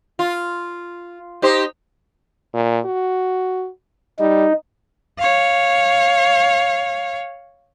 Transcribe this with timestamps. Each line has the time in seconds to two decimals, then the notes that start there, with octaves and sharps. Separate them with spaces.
0.19 F4
1.42 D#4 G4 C5
2.53 A#2
2.85 F#4
4.19 G3 D#4
5.18 C#5 F5